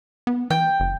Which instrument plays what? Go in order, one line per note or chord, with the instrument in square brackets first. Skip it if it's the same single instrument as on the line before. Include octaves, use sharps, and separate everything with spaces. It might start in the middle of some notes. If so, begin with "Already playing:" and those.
[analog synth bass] B3
[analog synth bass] E3 [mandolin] G5
[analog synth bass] F#1